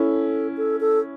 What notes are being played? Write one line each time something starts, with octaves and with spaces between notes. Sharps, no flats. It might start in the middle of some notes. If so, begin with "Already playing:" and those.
Already playing: C#4 E4 A4
A4
A4